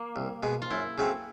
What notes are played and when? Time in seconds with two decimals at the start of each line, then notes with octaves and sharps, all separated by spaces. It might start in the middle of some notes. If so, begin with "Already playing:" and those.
Already playing: A#3
0.16 C2
0.43 B2 G#3
0.62 F4
0.71 F#2 E4
0.98 C#3 F#3 A3 C4